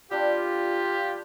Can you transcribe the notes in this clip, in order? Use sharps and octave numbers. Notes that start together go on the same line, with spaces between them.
G3 D4 F4 G4